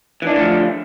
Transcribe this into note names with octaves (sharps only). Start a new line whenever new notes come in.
D3 E3 F3 A3 D4